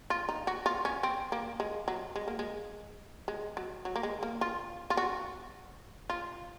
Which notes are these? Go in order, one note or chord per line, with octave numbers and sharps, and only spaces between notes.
F4
D#4
F#4
F4
C#4
C4
A#3
G#3
F#3
G#3
A#3
G#3
G#3
F#3
F#3
A#3
G#3
A#3
F4
F4
F#4
F4